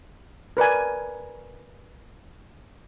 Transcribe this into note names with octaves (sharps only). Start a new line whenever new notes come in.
A#4 B4 D5 G#5